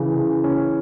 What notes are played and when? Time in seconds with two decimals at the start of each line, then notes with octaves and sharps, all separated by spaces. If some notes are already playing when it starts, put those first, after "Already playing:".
Already playing: C#3 E3
0.17 C#3
0.44 C#4